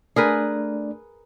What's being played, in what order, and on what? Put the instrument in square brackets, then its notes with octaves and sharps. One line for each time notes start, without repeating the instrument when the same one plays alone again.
[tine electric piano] A3 D4 D5 [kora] G#4 A#4 B4